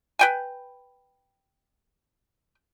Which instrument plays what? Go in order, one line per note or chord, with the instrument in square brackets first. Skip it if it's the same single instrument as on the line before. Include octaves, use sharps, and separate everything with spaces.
[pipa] B4 G5 G#5